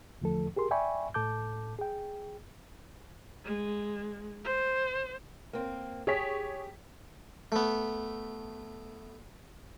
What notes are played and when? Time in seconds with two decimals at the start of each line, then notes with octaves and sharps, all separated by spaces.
0.21 E2 D3 F3 A3 A4
0.56 G4 G#4 A#4 C6
0.71 D5 E5 G5 G#5 B5 C#6
1.14 A2 A4 A5 D6 G6
1.79 G#4 G5
3.44 G#3
4.44 C5
5.53 A#3 C4
6.07 G4 G#4 C#5 B6
7.52 A3 B3